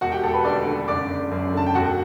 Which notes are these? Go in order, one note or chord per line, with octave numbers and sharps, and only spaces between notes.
E1 F#4 F#5
G4 G5
E1 A4 A5
B4 B5
D2 D5 D6
D3
F#1 D5 D6
F#1
F#2
D3 A5
G5
E1 F#4 F#5